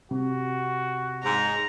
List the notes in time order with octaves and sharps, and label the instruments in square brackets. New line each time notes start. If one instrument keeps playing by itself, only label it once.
[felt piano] C3 [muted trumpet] F#4
[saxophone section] G#2 [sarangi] A#5